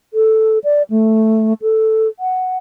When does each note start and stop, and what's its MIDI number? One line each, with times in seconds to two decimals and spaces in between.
0.14 0.58 69
0.64 0.82 74
0.90 1.53 57
1.62 2.08 69
2.19 2.58 78